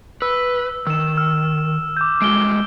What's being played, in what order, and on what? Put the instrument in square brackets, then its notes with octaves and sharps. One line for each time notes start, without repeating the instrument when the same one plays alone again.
[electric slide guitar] B4 [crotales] E6
[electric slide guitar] D#3 [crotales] E6 E7
[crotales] E6 F6
D6 G6
[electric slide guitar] G#3 A3 F#4 [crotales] D7 G7